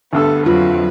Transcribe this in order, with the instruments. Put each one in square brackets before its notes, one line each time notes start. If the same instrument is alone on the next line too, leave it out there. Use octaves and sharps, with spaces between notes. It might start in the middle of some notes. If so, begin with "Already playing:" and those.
[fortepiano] D2 G2 E6 [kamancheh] B3 A4
[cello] F2 F#3 [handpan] F4 [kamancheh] B4